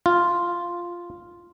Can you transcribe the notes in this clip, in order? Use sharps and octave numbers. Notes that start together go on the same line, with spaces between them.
F4